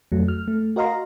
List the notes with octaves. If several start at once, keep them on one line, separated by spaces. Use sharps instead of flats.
F2 F#3 A3
F6
A3
F#4 A#4 D#5 F5 A#5 C6